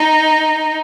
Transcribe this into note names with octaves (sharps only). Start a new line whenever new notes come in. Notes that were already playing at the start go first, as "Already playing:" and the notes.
Already playing: D#4